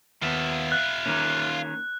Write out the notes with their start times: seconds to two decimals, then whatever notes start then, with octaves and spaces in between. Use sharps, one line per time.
0.22 D#2 B3 F4 E5
0.72 F#6
1.06 D#3 A#3 C#4